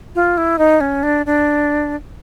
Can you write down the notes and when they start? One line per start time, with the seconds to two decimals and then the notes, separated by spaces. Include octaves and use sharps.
0.15 F4
0.37 E4
0.58 D#4
0.81 C#4
1.03 D4
1.26 D4